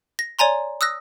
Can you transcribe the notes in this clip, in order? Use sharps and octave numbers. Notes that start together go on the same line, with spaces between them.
A#6
C#5 D5 G#5 A#5 C6
D#6 E6 F#6 A#6